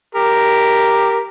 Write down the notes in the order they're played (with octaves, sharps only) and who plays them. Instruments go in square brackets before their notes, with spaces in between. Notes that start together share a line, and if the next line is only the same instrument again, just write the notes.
[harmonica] G4 A#4